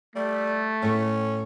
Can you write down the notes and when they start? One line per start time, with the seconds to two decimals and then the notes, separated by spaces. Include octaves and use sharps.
0.16 G3 A3
0.82 A2 C#4 A4